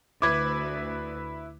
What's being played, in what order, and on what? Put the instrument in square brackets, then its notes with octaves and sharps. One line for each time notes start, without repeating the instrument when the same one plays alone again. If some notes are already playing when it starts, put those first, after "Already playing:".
[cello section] D2 [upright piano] E4 B4 [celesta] D6 G#6